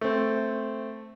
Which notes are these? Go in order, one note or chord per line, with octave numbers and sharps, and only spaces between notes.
A3 C4